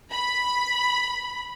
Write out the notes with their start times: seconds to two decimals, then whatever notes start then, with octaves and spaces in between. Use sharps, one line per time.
0.12 B5